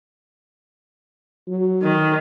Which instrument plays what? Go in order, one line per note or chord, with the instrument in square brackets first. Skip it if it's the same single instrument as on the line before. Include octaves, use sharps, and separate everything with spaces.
[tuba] F#3
[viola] D#3